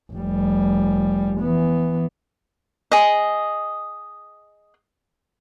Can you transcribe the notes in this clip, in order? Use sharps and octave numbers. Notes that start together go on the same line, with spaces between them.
F1 G3
E3 B3
G#4 D#5